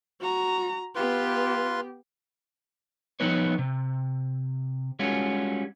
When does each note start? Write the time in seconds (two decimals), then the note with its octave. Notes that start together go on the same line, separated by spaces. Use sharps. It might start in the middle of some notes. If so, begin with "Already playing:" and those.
0.20 F#4 A#5
0.95 B3 F4 G4 B4 C6
3.20 F3 G3 B3 D#4 B4 C#5
3.59 C3
4.99 G3 G#3 C#4 F4 F#4